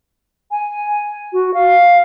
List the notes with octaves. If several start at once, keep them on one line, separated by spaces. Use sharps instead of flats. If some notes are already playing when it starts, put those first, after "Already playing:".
G#5
F#4
F5